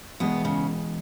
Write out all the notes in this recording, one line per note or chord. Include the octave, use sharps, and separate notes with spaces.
E2 B2 G#3 B3
C#3